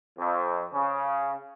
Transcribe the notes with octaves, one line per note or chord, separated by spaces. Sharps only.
F2
C#3